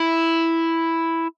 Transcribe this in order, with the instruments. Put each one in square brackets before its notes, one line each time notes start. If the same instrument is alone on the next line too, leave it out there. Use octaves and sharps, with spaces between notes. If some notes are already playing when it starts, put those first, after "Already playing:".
Already playing: [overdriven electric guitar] E4